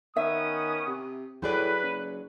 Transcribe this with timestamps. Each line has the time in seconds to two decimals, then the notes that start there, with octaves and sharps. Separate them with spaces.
0.16 D#3 B3 C#4 E5 D#6
0.87 C3
1.42 A2 F#3 G#4 B4 D5
1.82 F#1